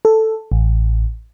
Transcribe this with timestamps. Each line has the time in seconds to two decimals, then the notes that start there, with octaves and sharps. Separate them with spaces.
0.05 A4
0.52 A1